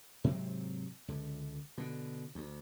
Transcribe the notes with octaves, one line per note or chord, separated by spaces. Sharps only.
G#2 C3 F#3 C4
C#2 D3
B2 D3
D2